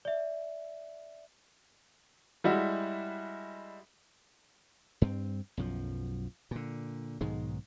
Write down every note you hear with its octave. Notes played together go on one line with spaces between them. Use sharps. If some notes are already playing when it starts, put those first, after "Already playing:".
D5 E5
G3 G#3 E4 F#4
G2 C4
B1 F#2 F3
A#2 D3
B1 G#2 D#3 G#3